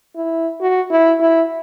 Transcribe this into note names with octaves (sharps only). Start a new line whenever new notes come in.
E4
F#4
E4
E4